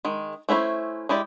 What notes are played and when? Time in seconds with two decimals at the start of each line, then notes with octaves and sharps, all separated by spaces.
0.05 D#3 G#3
0.49 A3 C#4 E4 B4 C5
1.09 G#3 E4 G4 D5